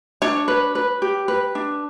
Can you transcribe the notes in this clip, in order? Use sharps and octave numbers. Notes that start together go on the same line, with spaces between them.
D4 C#5
B4
B4
G4
B4
D4